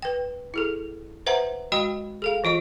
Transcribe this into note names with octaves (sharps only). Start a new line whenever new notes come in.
B4 G5
E4 G#4 A4
B4 C5 E5 F#5 A#5
G#3 F#4 D#5 G5 B5
G#4 A4 F5
E3 F4 D#5 C#6